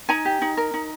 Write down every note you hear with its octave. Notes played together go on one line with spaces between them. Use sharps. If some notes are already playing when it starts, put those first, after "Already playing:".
D#4 G#5 A#5
G4
D#4
A#4
D#4